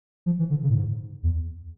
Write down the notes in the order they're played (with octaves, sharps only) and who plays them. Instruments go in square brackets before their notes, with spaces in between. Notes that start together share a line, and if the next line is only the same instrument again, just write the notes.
[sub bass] F3
E3
D3
C#3
A2
G#2
E2